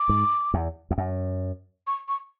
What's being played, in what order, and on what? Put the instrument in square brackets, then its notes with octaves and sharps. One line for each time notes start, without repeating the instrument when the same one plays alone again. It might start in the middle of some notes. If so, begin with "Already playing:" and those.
Already playing: [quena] D6
[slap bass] G#2
E2
E2
F#2
[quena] C#6
C#6